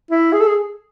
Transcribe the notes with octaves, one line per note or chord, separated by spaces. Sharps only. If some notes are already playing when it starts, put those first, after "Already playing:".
E4
G#4
A4
G#4